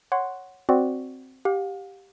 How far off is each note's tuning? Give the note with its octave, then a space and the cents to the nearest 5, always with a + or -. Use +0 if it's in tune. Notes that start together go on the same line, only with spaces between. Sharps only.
C#5 -5 F#5 +0 C6 -10
C4 +0 F#4 +0 D5 +5
G4 +0 F5 +40